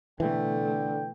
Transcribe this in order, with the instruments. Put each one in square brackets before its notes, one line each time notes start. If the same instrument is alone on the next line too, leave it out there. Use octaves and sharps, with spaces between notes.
[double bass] B2 A3 [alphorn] D3 [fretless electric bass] E3 [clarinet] G5